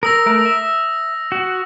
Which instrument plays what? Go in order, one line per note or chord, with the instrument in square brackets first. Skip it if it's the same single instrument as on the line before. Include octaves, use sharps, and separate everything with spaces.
[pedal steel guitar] A#4 [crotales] D#6 E6 A#6
[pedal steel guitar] A3 A#4
E5
F#4